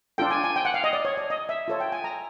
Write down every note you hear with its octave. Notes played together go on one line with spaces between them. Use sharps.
D4 F4 A4 G5
G#5
G#5
G5
F#5
F5
D#5
D5
C#5
D5
D#5
E5
F4 A4 C#5
G5
G#5
A#5